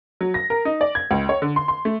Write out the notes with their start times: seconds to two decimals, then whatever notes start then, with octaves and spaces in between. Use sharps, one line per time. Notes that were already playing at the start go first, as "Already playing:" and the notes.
0.21 F#3
0.34 A#6
0.50 A#4
0.65 D#4
0.81 D5
0.95 G#6
1.11 C#2
1.29 C#5
1.42 D3
1.56 C6
1.68 C6
1.85 A3